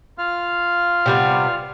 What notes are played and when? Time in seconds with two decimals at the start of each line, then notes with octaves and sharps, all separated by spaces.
0.18 F4 F5 F6
1.06 C3 G3 B3